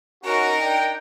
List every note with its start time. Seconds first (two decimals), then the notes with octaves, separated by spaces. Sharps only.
0.24 C#4 D#4 F#4 A#4
0.61 D4 G5